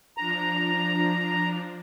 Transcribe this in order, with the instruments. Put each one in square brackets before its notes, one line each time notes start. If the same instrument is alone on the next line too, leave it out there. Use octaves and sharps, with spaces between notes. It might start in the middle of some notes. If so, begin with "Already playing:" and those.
[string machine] F3 D4 [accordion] A#5